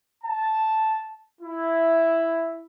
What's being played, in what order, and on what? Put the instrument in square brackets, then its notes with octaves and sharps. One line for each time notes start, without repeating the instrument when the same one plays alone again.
[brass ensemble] A5
E4